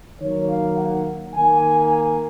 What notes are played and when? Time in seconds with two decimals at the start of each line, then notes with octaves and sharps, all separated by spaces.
0.20 D#3 F#3 A#3 C#5
0.48 F5
0.77 F#5
1.34 D#3 A#3 G#5
1.62 G#5
1.91 G#5